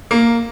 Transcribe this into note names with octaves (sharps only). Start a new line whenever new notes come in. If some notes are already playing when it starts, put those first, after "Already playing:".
A#3